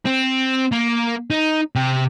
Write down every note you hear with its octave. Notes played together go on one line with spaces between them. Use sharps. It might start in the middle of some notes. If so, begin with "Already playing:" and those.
C4
A#3
D#4
C3 G4